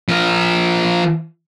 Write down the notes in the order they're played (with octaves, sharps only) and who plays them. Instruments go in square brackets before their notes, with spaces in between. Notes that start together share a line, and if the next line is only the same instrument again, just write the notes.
[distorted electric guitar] F3 A#4